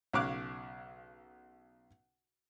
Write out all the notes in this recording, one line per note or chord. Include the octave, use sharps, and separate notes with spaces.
B1 C#3 C#5 F5 D6 F#6